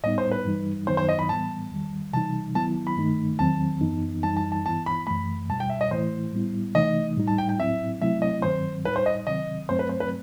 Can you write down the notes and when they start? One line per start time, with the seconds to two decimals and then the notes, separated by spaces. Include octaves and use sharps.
0.03 A2 G3 B3 D#4 D#5
0.18 C5
0.32 B4
0.45 G2 E3 G3 D#4
0.87 F#2 D#3 F#3 B3 D#4 C5
0.97 C5
1.09 D#5
1.19 B5
1.29 A2 E3 G3 B3 A5
1.71 E2 D#3 G3
2.13 C3 E3 G3 D#4 A5
2.55 D#3 F#3 B3 E4 A5
2.87 B5
2.97 G2 D#3 A3 D#4
3.39 E2 D#3 F#3 C4 A5
3.81 F#2 E3 B3 D#4
4.23 F#2 E3 G3 D#4 A5
4.37 A5
4.52 A5
4.65 G2 E3 B3 E4 A5
4.86 B5
5.07 F#2 E3 A3 B5
5.48 E2 B2 G3 A5
5.60 G5
5.70 E5
5.81 D#5
5.91 A2 E3 A3 E4 C5
6.33 A2 G3 B3 E4
6.75 C3 E3 A3 D#4 D#5
7.17 A2 G3 D#4
7.27 A5
7.38 G5
7.49 G5
7.58 A2 F#3 C4 E4 E5
8.02 C3 F#3 A3 C4 E4 E5
8.22 D#5
8.42 G2 D#3 F#3 C4 C5
8.85 A2 G3 D#4 B4
8.96 C5
9.06 D#5
9.27 C3 D#3 F#3 C4 D#5
9.69 G2 F#3 A3 C4 C5
9.79 B4
9.89 C5
10.00 B4